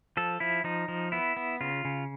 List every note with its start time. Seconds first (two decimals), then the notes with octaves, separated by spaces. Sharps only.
0.17 F3 A4
0.40 F3 E4
0.64 F3 D#4
0.88 F3
1.12 B3 E4
1.37 B3
1.61 C#3 F4
1.85 C#3